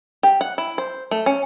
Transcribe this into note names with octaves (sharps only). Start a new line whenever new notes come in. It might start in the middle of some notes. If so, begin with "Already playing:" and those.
G4
F#5
E4
C5
A3
C#4